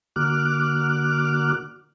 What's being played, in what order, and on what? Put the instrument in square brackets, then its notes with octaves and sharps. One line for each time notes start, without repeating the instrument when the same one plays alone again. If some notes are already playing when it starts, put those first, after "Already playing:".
[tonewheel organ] D3 A#3 F#4 D6 F6 F#6